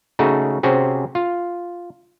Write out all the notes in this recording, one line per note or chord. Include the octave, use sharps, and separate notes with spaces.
C#3 A3 D#4 F#4 G#4
C3 C4 C#4 F#4 G#4
F4